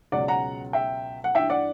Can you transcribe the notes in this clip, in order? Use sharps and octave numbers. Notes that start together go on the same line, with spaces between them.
C#2 B2 F#3 D5 F#5
F#5 A#5
E5 G5
F#5
G2 E3 E5 G5
D5 F#5